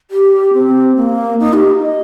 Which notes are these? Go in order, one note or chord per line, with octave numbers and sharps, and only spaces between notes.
G4
C4
A#3
D#4
G4
D#5